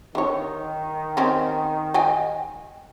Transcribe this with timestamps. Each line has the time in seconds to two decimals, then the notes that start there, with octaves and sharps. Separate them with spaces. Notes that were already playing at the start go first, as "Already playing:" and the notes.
0.15 D3 D#3 C#5
1.17 C4 C#4
1.94 D#5 G5 G#5